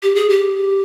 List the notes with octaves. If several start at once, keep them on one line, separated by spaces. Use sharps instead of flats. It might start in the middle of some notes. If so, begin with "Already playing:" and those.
G4
G#4
G4